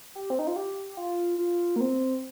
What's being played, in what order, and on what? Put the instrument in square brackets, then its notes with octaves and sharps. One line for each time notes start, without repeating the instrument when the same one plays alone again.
[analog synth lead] G4
C4
D#4
F4
G4
F4
F4
A#3
C4